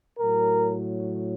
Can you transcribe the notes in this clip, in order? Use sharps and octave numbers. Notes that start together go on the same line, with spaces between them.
A2 F#3 A#4